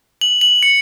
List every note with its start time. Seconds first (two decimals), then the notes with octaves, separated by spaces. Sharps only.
0.21 F#7
0.41 F#7
0.63 C#7